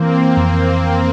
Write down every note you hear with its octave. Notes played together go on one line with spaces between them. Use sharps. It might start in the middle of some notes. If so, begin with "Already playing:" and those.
Already playing: E3 A#3 C4
A#3 C4
F2